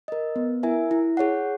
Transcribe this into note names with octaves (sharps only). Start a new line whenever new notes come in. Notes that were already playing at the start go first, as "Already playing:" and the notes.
A#4 D#5
B3
E4 A#4 E5 G#5
E4
G#4 C#5 F#5